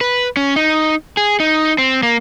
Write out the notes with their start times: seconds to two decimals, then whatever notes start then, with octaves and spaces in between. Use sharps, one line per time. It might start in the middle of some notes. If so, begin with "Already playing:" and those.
0.01 B4
0.37 C#4
0.56 D#4
1.17 G#4
1.40 D#4
1.78 C4
2.03 A#3